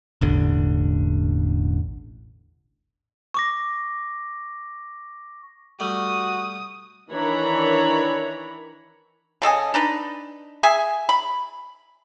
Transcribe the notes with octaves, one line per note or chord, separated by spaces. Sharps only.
E1 A1 D3
C#6 D6 A#6
G3 A3 F#4 D#6
D#3 E3 D4 C#5 A#5 B5
C#3 A4 D#5 G#5
D4 D#4 B4
G#4 E5 G#5
B5